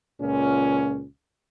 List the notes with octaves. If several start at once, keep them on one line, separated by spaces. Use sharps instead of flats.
C#2 A#2 C#4